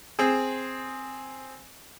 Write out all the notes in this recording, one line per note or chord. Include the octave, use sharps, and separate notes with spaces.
C4 G#4